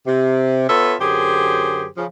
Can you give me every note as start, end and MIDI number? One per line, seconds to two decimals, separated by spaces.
0.06 0.65 48
0.68 0.93 59
0.68 0.93 65
0.68 0.93 69
0.68 0.93 73
0.68 0.93 76
0.99 1.86 42
0.99 1.86 50
0.99 1.86 67
0.99 1.86 68
0.99 1.86 72
1.96 2.04 49
1.96 2.04 53